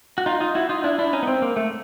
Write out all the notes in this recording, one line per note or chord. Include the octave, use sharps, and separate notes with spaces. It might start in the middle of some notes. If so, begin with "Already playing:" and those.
F#4
D#4 F4
D#4 F4
E4 F#4
D#4 F4
D4 E4
D4 E4
C#4 D#4
B3
C4
A#3
A3